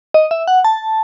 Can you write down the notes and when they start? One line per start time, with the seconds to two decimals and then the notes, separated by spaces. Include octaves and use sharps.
0.14 D#5
0.31 E5
0.48 F#5
0.65 A5